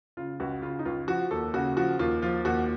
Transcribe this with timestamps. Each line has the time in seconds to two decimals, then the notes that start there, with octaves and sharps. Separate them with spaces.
0.17 C#3 F4
0.40 C#2 F#4
0.62 C#3 F4
0.79 D#4
0.85 C#2 F4
1.08 F3 F#4
1.31 D#2 A4
1.54 C#3 F#4
1.77 F3 F#4
1.99 D#2 F4
2.22 F3 F4
2.45 D#2 F#4